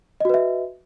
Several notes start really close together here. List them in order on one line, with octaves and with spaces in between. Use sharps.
D#5 F#4 B4 E5